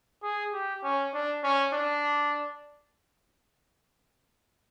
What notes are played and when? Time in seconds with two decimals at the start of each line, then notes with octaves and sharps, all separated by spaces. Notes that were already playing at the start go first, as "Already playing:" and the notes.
0.23 G#4
0.53 G4
0.83 C#4
1.14 D4
1.44 C#4
1.73 D4